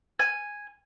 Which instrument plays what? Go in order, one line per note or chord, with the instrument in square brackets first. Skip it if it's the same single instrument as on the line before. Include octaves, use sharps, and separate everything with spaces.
[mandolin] G#5